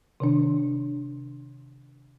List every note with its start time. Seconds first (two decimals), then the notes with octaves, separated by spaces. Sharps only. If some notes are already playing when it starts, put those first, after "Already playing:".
0.20 C3 D#3 D4